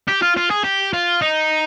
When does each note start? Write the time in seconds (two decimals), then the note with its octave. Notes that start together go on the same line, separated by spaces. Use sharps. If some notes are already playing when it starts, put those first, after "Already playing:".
0.08 G4
0.22 F4
0.37 F4
0.51 G#4
0.64 G4
0.93 F4
1.21 D#4